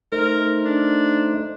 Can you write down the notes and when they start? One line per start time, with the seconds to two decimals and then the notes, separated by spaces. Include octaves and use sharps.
0.12 A3 D#4 A#4 C5
0.65 D4